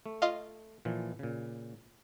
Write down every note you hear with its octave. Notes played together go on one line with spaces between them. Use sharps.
A3
F4 D#5 F5
A#2 E3 F3
A#2 C#3